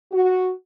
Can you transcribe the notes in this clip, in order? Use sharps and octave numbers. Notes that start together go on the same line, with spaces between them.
F#4